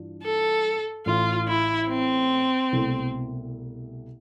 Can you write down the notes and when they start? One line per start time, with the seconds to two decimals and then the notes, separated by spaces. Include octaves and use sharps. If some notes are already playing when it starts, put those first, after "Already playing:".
Already playing: G2 E3 D4 F4
0.23 A4
1.06 A1 A2 E3 F4
1.48 E4
1.89 C4
2.72 C2 B2 A3 E4